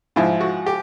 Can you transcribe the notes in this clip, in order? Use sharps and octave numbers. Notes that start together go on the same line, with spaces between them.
G#2 F3 E4
F#4
G4